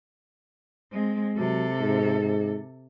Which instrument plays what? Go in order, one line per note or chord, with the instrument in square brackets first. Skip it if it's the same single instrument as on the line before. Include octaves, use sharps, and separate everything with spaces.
[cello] G#3 C4
[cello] C3 A4 [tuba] F#3
[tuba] G#2